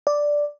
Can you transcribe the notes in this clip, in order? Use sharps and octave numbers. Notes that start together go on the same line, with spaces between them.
D5